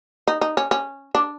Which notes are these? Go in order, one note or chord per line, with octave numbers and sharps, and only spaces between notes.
D#4
D#4
C#4
C#4
D4